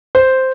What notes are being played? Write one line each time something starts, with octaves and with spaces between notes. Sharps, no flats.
C5